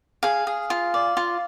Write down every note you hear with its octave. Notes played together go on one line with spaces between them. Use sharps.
G#4 F5
G#4
F4
D5
F4